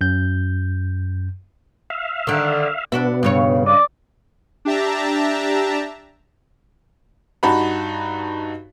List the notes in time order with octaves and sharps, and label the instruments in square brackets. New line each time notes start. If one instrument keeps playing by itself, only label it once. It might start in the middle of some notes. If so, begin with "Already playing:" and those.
[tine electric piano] F#2 G6
[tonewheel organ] E5 F5
[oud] D3 D#3
[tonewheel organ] B2 B3 [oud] D4 F#4 E5
[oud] G2 C#3 C#5
[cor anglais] D5 [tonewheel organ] D#5
[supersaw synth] D4 G4 E5 A5 A#5
[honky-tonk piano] G2 D#4 F#4 A5 B5